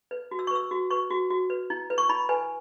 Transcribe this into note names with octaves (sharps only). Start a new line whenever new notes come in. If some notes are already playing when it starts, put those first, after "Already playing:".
B4
F#4
E6
C#6
B4 E6
F#4
B4 C#6
F#4
F#4
B4
E4
B4
C#6
E4 B5
B4 G#5